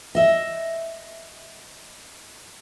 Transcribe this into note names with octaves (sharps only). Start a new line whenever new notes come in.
D#5 E5